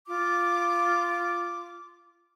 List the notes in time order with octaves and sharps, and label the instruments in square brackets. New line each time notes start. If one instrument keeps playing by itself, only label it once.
[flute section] F4 D6